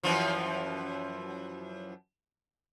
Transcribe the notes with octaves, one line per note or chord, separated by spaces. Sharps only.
F#2 E3 F3